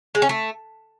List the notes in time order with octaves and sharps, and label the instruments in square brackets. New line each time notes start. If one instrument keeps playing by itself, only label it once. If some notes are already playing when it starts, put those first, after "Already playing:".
[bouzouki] G#3
C#4
A3